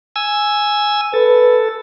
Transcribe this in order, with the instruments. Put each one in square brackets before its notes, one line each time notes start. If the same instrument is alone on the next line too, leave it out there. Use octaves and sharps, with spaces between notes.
[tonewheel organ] G#5 E6
[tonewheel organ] A4 [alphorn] B4